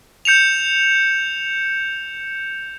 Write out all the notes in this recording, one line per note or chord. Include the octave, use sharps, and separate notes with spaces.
G6 C#7 E7 F7